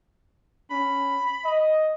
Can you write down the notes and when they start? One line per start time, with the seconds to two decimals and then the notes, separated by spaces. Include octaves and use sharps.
0.70 C#4 B5
1.45 D#5